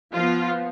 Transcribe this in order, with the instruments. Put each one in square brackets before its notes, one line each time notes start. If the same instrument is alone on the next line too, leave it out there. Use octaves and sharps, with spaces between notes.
[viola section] F3 B3 F4